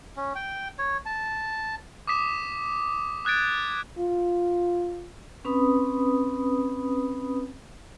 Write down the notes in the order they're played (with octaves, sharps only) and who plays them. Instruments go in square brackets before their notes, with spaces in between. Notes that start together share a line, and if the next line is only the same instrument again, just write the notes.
[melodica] C#4
G5
C#5
A5
[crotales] D6 D#6 B6 E7
D#6 F#6 G#6 A6 D7
[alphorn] F4
[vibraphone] C4 C#4 B4 B5 D#6